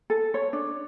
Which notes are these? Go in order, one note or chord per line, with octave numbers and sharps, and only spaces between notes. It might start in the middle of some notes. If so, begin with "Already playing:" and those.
A4
C#5
D4